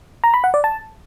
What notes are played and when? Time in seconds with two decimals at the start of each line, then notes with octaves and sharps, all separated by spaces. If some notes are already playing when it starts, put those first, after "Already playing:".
0.24 A#5
0.34 B5
0.44 F#5
0.54 D5
0.64 A5